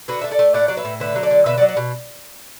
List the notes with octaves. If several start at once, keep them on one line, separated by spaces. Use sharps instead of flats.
D3 F#4 B4
A3 E5
A4 D5
A3
A2 D5 F#5
F#3 D5
B4 E5
A2
D3 B4 E5
F#3
A4 D5
D3
B2 B4 E5
D5 F#5
F#3
D5 F#5
B2